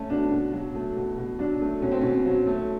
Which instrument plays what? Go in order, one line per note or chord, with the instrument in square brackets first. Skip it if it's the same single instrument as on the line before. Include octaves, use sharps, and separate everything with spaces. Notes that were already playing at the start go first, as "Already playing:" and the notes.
Already playing: [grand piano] A3 [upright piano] C#4
[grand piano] B2 [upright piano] D4
[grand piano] B2
F#3
A3
B2
B2
[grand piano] F#3 [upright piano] D4
[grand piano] A3
[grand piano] B2 [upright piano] C#4
[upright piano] C4
[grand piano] B2 [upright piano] C#4
[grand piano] F#3
A3